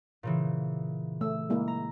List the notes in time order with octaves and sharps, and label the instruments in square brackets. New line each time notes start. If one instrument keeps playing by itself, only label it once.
[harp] A#2 C#3 E3
[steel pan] A3 [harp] E6
[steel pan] G#3 A#3 E4
[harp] A#5